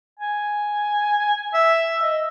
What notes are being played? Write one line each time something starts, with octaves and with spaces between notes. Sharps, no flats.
G#5
E5
D#5